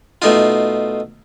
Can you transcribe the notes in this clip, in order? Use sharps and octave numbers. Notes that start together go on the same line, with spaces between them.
B2 A3 D#4 F4